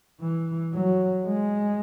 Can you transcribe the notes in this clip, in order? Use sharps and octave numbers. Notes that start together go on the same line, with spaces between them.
E3
F#3
G#3